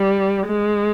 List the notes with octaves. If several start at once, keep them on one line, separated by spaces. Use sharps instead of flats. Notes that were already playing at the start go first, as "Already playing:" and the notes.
Already playing: G3
G#3